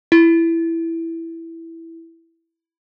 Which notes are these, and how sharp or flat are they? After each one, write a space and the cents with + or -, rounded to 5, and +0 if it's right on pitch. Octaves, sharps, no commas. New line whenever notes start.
E4 +5